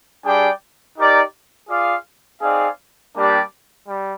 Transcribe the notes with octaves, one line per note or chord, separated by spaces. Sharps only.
G3 D4 G#4 D5 G5
D#4 G4 A#4 D5
F4 G#4 D5 F5
C4 D#4 G#4 D5 F5
G3 A#3 D4 G4 D5
G3